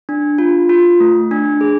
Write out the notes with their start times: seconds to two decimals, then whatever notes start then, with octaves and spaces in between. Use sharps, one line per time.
0.09 D4
0.38 F4
0.69 F4
1.00 A3
1.31 D4
1.61 G#4